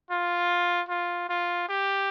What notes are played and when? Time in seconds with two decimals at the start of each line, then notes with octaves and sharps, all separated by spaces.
0.10 F4
0.89 F4
1.29 F4
1.68 G4